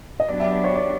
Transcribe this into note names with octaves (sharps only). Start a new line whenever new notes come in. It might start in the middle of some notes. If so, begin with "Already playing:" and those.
D#5
F#3 B3 D4 G4 D5
E5
D5
C#5
D5